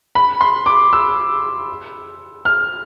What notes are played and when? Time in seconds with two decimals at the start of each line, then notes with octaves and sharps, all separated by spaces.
0.15 B5
0.41 C6
0.66 D6
0.93 E6
2.45 F6